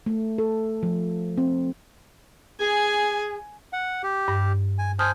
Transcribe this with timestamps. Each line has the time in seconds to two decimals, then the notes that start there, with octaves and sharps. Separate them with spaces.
0.06 A3
0.38 A4
0.83 F3
1.38 C4
2.59 G#4 G#5
3.73 F#5
4.03 G4
4.28 G2
4.79 G#5
4.99 C5 G#5 A5 D#6 F6